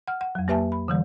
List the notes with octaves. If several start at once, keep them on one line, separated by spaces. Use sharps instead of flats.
F#5 F6
F#5
F2 F#3
A#3 G4 B4 E5 G#5 A5
B5
D3 E3 G3